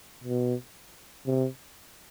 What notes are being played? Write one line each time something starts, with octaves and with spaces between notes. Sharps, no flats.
B2
C3